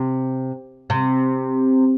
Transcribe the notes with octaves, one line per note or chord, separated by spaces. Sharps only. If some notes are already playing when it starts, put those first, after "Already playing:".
Already playing: C3
C3